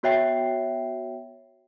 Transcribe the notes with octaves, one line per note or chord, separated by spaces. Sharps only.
B3 F#4 C#5 E5 G5 C7